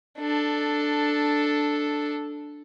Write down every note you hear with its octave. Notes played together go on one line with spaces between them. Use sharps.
D4 A4